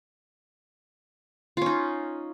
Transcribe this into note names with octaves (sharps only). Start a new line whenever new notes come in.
C#4 D#4 F4